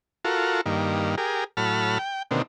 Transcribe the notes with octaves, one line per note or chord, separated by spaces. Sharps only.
F4 F#4 A4 A#4
G2 D#3 A#3
G4 G#4 A#4
A2 F#3 A5 B5 F6
G5
B2 D3 D#3 A#3 C4